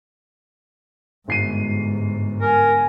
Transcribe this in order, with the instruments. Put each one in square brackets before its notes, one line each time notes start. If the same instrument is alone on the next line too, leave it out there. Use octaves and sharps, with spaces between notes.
[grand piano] G1 C7 D#7 [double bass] G#2
[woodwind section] A#4 [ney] G#5